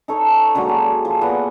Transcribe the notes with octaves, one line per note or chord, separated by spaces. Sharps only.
D#4 A4 C#5
D3 F#3 G#3 A#3
G#3
F3
A#2 B3 F#5